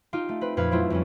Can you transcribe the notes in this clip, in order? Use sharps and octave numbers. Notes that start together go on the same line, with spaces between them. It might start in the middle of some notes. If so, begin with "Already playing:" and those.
D#4 F4 G4
A3
C4 B4
F2 A#2 B4 F5 G#6
F#3 A3 C4 E4 F4
F2 G3 C#4